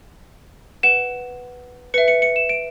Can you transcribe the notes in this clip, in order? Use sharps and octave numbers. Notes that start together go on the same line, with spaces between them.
B4 F#5 E7
B4 E5 C#7
C#7
C#7
E7
D7